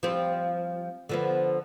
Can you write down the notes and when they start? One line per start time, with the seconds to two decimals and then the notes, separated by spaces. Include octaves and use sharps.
0.03 F3 G3 C4
1.09 D3 F3 B3